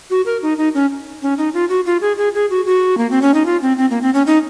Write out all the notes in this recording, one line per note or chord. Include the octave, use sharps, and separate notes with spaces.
F#4
A#4
D#4
D#4
C#4
C#4
D#4
F4
F#4
F4
G#4
G#4
G#4
F#4
F#4
A#3
C4
C#4
D#4
F4
C4
C4
A#3
C4
C#4
D#4